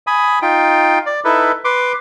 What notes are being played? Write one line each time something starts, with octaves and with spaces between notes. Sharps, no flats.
G#5 B5 D#6
D#4 F4 G5
D5
D#4 E4 A4 B4
B4 C6 D6